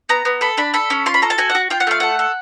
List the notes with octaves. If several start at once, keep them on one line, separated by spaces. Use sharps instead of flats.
B3 A#5
B3
A4 B5
D4 B5
A4 B5
C#4
F4 C6
B5
A4 A#5
A5
F#4 G#5
F#5
F#4
F4 G5
F#5
A3 F5
A4 F#5
A4